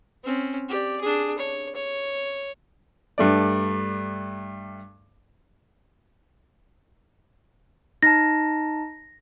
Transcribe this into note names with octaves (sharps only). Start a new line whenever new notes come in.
C4 C#4
G4 D5
D4 G#4
C#5
C#5
G2 A3 D5
D#4 A5 A#6